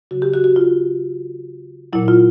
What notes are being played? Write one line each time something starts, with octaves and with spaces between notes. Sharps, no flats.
C#3 F#3 F#4
G4
F#4
F#4
F4
A#2 F#3 E4
F4